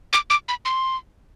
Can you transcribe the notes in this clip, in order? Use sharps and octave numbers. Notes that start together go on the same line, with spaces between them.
D6
D6
B5
C6